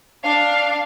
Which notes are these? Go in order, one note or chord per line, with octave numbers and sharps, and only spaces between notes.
D4 F5